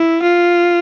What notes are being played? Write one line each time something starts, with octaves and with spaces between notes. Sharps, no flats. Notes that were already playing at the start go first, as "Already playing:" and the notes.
Already playing: E4
F4